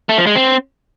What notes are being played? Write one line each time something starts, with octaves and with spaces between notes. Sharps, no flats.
A3
F3
G#3
C4